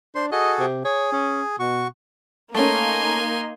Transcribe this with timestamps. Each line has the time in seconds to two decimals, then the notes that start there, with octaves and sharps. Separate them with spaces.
0.15 D4 C5 C6
0.32 F#4 G#4 A4 D#5
0.59 C3
0.85 G#4 C#5
1.13 C#4
1.59 B2 F#4 C#6
2.55 A3 A#3 C#4 D#4 G#5 C6